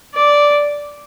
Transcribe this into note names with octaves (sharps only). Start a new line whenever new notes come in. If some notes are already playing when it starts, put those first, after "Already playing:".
D5